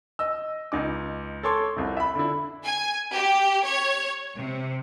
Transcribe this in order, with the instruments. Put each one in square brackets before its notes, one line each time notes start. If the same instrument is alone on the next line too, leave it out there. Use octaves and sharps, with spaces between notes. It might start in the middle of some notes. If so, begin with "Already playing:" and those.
[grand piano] D#5 E6
C#2 D#4 D6
A4 C#5 C6 D6
C2 F2 C3
E5 B5
D3 D4 E4
[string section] G#5
G4
C#5
C3